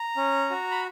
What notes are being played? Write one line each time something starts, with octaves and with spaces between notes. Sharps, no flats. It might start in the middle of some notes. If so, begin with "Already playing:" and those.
Already playing: A#5
C#4
F#4
B5